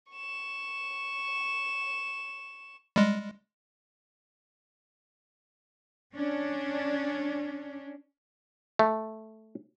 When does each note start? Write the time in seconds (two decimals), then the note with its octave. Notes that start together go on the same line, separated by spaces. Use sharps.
0.12 C#6 E7
2.96 G3 G#3
6.14 C#4 D4
8.79 A3